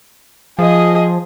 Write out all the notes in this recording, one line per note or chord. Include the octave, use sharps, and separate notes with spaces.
F3 G#4 D#5